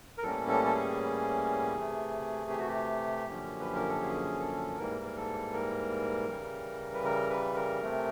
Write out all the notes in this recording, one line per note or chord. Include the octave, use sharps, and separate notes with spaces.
A#4
A2 E3 G3 A#3 C#4 A4
A4
A4
G#4
C3 E3 A3
G4
F#4
G4
F#2 D3 F3 A#3 C#4
B4
A#4
A4
G#4
A4
G#2 E3 G3 A#3 A#4
A#4
A4
A#4
C#3 E3 G3
B4
A#4
B4
A#4
C3 E3 A3 C4